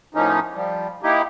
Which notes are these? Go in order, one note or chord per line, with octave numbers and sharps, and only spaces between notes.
A2 F3 A#3 C#4 D#4
F3 G3
A#3 D#4 E4 G4